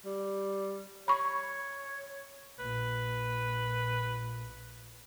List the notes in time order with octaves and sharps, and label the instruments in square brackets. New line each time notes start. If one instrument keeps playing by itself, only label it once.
[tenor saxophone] G3
[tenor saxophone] C#5 [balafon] B5 C#6
[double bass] A#1 A#2 [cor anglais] B4